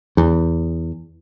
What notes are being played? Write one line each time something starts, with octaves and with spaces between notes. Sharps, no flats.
E2